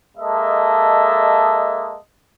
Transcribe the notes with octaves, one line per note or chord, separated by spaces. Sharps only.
G#3 A#3 A4 D#5 E5 A5